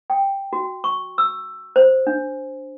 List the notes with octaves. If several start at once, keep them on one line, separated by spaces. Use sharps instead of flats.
G5
F#4
C#6
E6
C5
D4